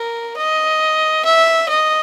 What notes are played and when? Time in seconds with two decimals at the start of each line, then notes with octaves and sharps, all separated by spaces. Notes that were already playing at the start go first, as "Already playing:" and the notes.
Already playing: A#4
0.37 D#5
1.25 E5
1.69 D#5